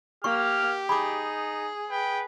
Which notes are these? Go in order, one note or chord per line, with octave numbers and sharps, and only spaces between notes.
A#3 G4 C#6 F6
D#4 G#4 B5 D6
B4 G5